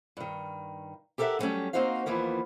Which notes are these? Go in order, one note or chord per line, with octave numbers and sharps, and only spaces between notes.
G2 D#3
G4 A4 A#4 C5 E5 F#5
D3 F#3 G3 A3 C#4
A#3 C4 D#4 F#4 C5 F5
D#2 E3 F3 A#3 B3